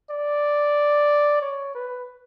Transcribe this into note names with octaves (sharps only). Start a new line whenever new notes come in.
D5
C#5
B4